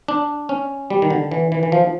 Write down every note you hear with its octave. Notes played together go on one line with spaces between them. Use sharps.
D4
C#4
G3
D#3
D3
E3
E3
E3
F3